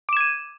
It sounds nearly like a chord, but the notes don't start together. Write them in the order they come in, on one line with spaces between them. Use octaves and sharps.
D6 E7 G#6 D#7